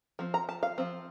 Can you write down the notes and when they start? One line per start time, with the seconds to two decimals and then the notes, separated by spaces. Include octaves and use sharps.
0.19 F3 C4
0.34 A#5
0.49 A5
0.63 F5
0.78 F3 C4